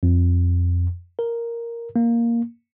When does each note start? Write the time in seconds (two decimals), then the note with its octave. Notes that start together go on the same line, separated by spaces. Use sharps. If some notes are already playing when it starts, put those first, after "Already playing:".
0.03 F2
1.19 A#4
1.96 A#3